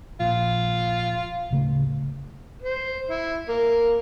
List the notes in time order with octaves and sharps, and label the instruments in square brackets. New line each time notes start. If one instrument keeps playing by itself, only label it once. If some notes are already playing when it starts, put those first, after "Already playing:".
[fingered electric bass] A#1 [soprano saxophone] F4
[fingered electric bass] D1 C#3 A3
[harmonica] C5
E4
A#3